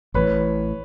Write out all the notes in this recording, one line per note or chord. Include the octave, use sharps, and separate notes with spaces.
A1 A2 E3 B4 C#5